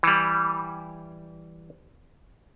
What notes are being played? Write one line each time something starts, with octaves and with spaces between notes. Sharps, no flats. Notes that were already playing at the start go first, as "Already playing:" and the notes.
E3 G3